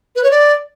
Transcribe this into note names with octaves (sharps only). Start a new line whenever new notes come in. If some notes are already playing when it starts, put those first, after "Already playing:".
B4
C#5
D5